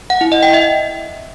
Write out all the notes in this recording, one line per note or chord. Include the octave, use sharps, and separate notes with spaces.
F#5
E4
D#5
G5
E5